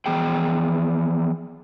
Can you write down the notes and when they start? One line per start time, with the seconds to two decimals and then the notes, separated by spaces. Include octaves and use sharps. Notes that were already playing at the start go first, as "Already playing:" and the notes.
0.06 E3 F3 B3 G#4 G5